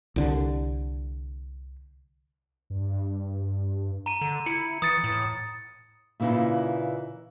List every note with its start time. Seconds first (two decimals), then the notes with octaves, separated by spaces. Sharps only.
0.16 C2 D3
2.70 G2
4.06 A#5 D#7
4.21 D3
4.46 E4 C#7
4.82 E3 D#6 A6 C#7
5.04 A2
6.20 A#2 C#3 E3 D#4 E4